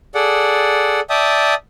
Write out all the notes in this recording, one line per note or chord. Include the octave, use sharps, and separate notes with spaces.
G#4 A4 D5 F#5
D5 E5 G5 A5 D#6